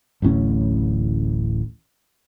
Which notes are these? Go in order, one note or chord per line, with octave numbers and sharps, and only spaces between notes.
D1 A1 A2 C#4